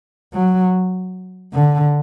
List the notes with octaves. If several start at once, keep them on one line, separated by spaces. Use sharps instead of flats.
F#3
D3